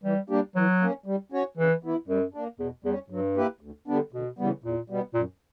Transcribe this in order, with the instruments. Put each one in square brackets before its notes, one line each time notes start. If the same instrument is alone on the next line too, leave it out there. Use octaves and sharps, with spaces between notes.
[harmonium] E3 [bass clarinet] G3
[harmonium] G3 A#3 D4 G4
[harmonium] E3 [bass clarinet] F#3
[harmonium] A#3 C#4
G3
C#4 F#4 C#5
[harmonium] C#3 [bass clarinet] E3
[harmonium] E3 B3 E4
[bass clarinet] F#2 [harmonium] G3
[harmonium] A#3 D4
[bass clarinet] E2 [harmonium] B2
[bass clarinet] E2 [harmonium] G3
[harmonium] C#4
[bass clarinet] G2 [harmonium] F#3
[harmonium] A#3 E4 G4 B4
D2
D3 G3 B3 D4
[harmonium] D2 [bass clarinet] B2
[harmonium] C#3 E3 G3 B3
[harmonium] E2 [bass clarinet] A#2
[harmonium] B2 G3 B3
[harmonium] F#2 [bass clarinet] A#2